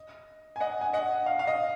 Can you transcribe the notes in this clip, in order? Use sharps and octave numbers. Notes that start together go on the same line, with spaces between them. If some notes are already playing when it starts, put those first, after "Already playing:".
Already playing: D#5
G#5
D#5 F#5
G#5
D#5 F#5
F5
F5
D#5